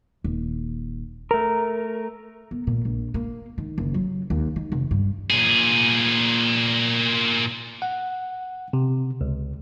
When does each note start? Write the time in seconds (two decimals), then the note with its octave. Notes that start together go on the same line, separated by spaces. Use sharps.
0.24 D#1
1.31 A3 A#4
2.51 B3
2.67 A#2
2.85 A#1
3.14 A#3
3.58 D#3
3.78 F#1
3.94 F#3
4.30 D#2
4.56 D#3
4.72 F1
4.91 G2
5.30 A#2 G#4
7.82 F#5
8.73 C3
9.21 C#2